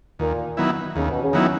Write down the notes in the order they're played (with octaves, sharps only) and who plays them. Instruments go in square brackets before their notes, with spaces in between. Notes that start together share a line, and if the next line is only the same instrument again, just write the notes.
[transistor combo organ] D#2 [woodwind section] A#2
[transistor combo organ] D#3 F#3 B3 E4
[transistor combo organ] D#2 [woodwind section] C#3
[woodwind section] B2
C#3
[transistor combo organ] D#3 F#3 B3 E4